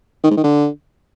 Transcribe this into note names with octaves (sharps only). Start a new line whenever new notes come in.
D#3
G#2
D#3
D3